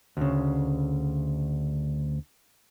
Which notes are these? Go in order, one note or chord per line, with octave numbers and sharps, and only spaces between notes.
D2 C#3